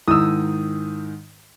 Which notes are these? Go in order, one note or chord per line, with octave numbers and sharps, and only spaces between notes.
G#2 D#3 E4 D#6 E6